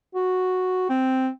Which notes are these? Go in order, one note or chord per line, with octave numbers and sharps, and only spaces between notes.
F#4
C4